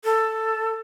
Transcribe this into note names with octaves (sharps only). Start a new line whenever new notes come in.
A4